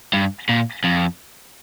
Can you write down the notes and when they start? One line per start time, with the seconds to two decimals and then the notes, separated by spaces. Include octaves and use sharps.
0.13 G2
0.49 A#2
0.84 F2